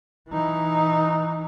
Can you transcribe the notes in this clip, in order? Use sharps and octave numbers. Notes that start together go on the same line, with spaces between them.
E3 D#4